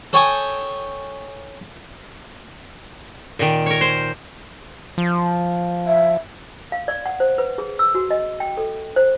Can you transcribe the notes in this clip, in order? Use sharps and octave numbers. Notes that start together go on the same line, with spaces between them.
A4 C#5 G5 G#5 C#6 D#6
A#2 D#3
A#4 C#5
C5
F3
E5
F5
D5
F#5
C5
B4
G#4
E6
F#4
D#5
G5
A4
C5